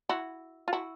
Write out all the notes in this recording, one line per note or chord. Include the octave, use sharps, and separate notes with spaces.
E4 F#4
F4
E4 F#4